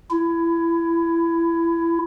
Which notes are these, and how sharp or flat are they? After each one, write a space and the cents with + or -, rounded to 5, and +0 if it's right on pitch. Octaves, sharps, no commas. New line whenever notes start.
E4 +25